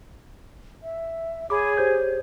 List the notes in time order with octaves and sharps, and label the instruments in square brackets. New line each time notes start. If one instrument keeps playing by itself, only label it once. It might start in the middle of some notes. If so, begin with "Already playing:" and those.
[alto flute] E5
[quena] G#4 [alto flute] C#5 [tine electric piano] B5 D6
[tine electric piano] G4 C5 G6